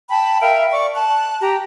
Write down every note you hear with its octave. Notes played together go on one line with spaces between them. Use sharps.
G5 A5 B5
A#4 E5 F5 G5
D5 C#6 D6
A5 F#6
G4 A#5